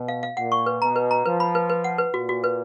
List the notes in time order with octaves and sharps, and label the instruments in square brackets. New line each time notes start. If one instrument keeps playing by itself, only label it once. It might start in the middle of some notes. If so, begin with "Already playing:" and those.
Already playing: [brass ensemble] B2
[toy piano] F5
F5
[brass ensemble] A#2 [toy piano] F#5
[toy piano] C#6
B4
[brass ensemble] B2 [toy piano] A#5
[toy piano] B4
A#5
[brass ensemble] F3 [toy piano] B4
[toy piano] B5
B4
B4
F#5
B4
[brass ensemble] A#2 [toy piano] F#4
[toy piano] F#4
B4